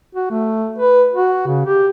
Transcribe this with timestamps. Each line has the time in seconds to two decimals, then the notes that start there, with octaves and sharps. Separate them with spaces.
0.15 F#4
0.31 A3
0.78 B4
1.13 F#4
1.47 C#3
1.65 G4